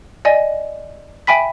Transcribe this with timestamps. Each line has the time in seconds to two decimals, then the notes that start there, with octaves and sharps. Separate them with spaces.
0.25 D5 D#5 G#5
1.27 E5 G5 G#5 B5 B6